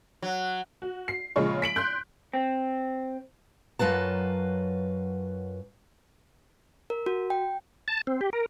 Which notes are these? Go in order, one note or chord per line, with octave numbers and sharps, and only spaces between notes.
F#3
F#4
C7
A#1 C#3 G#3 F4 C#5 C#6
B6 D7 F#7
C6 F#6 G6
C4
F#2 F#3 F4 B4 A5
A#4
F#4
G5
A5
C4
G4
A#4